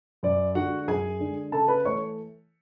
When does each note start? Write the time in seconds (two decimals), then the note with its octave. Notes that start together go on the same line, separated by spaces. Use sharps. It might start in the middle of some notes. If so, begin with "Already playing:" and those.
0.23 F#2 D5
0.55 D3 G#3 F#4 F#5
0.88 F#2 G#4 G#5
1.20 D3 G#3
1.52 C#3 A4 A5
1.68 B4 B5
1.84 E3 A3 C#5 C#6